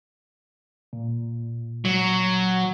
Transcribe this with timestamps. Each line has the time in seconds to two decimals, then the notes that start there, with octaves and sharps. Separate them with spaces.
0.93 A#2
1.85 F#3